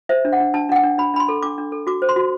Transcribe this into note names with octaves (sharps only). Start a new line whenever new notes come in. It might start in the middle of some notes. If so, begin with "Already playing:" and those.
C5 E5
D4
F#5
D4
D4 A5
D4 F#5
G5
D4
D4 B5
D4 B5
C6
A4
D4 D6
D4
A4
F#4 D6
C5
C6
F#4